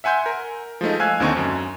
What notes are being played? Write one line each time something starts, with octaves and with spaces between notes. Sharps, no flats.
E5 F#5 G#5 C6 G6
A#4
F3 G#3 A3 D#4
F5 G#5 E6 F#6 G#6
D#2 D3 C4 D#4 G#5 C#6
F#2